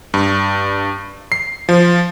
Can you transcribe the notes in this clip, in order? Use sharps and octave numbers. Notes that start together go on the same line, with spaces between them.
G2
C7
F3